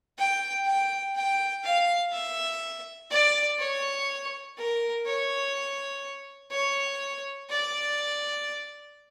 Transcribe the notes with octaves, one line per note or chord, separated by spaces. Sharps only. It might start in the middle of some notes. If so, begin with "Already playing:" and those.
G5
G5
G5
F5
E5
D5
C#5
A#4
C#5
C#5
D5